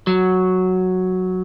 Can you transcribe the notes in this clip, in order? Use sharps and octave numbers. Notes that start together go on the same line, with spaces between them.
F#3